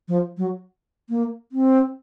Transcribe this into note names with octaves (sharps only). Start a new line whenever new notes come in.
F3
F#3
A#3
C4